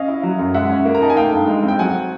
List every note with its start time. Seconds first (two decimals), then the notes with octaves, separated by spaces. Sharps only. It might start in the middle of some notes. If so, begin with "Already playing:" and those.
Already playing: C#4 D#5 F5
0.08 E4
0.23 F#3
0.39 F#2
0.54 G#3 E5 F#5
0.70 C#4
0.85 A#3
0.95 A#5
1.02 D#4 A5
1.10 G#5
1.17 A3 F5 G5
1.33 G2
1.47 G#3
1.63 C4 G5
1.79 F#3 F#5 G#5